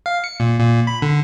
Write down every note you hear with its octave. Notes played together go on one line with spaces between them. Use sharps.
F5
C#7
A#2
A#2
B5
D3